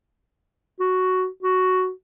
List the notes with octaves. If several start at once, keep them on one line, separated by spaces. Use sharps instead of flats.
F#4
F#4